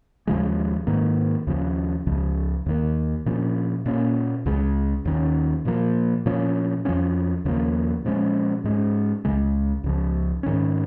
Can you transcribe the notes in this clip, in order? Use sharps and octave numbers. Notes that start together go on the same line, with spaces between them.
D#2 C#3 F3 G#3
G#2 D#3 A#3
D#2 C#3 F3 C#4
C#2 C#3 F3
D#2 D#3 A#3
A#2 F3 C#4
A#2 A#3 C#4
C#2 C#3 G#3
D#2 D#3 C#4
A#2 F3 A#3
A#2 F3 C#4
F2 F3 A#3 C#4
D#2 C#3 F3 A#3
A#2 F3 G#3 C#4
G#2 G#3 C#4
C#2 C#3 G#3
C#2 C#3 F3
G#2 D#3 C#4